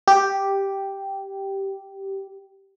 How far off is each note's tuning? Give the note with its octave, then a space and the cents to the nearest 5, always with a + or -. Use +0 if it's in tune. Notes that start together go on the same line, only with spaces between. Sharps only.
G4 -5